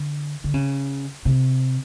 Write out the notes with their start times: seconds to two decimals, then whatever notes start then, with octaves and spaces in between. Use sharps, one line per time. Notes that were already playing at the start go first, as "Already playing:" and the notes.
Already playing: D3
0.44 D3
0.54 C#3
1.25 C3